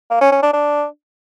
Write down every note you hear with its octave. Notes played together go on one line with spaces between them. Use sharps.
A#3
C#4
C#4
D4
D4